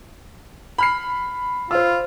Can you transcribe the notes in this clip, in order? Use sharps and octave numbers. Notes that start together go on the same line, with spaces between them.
B5 F6 C7
F4 C5 E6